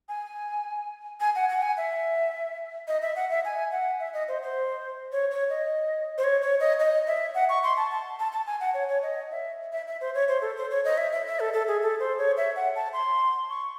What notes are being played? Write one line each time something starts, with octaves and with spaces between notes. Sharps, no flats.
G#5
G#5
F#5
F#5
G#5
E5
D#5
E5
F#5
E5
G#5
F#5
E5
D#5
C5
C5
C#5
C#5
D#5
C5
C#5
C#5
D#5
D#5
E5
F#5
C#6
C6
A5
A5
A5
A5
G#5
F#5
C#5
C#5
D#5
E5
E5
E5
C5
C#5
C5
A4
C5
C#5
D#5
E5
E5
E5
A4
A4
G#4
A4
C5
C#5
E5
F#5
A5
C6
C#6